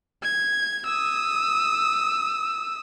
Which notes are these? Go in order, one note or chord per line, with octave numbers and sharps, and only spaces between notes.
G#6
D#6 E6